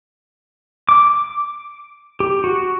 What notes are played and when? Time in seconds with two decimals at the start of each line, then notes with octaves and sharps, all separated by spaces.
0.89 D6
2.20 G4
2.44 F#4